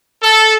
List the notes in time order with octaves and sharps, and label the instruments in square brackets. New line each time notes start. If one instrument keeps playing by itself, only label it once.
[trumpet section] A4